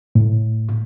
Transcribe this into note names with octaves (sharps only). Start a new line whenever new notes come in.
A2